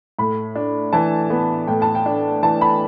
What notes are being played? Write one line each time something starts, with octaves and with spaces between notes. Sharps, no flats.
A2 B5
D4
E3 A5
B3
A2 G5
A5
G5
D4
E3 A5
B5